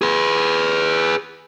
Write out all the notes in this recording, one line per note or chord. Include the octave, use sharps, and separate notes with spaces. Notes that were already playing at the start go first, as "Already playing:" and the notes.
G#4 B4